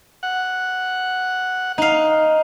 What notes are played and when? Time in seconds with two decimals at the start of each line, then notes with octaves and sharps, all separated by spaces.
0.23 F#5
1.78 D#4 F5